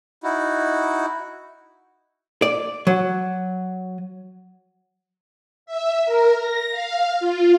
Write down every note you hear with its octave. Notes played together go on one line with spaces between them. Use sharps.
D#4 E4 F#4
D5
F#3
E5
A#4
A#6
F5
F4